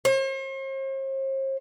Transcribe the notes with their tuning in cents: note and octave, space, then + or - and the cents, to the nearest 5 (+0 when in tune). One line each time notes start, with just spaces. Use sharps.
C5 +45